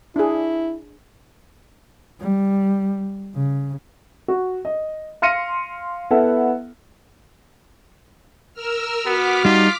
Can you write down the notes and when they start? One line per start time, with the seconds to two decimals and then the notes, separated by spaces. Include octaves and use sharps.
0.16 D4 E4 G#4
2.20 G3
3.35 C#3
4.28 F#4
4.65 D#5
5.22 F5 C6 F6 A#6 C#7 D#7
6.11 B3 E4 A4 E5 F#5
8.54 A#4 E6 F6
9.06 B3 F#4 D6 F6 B6
9.45 G3 D#4 F4